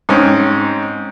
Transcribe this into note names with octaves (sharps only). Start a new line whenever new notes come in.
G#2 C4 C#4